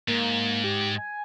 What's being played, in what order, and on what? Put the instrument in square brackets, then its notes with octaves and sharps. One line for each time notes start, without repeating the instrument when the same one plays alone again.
[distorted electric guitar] G#2 [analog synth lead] A#3
[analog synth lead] G4
G#5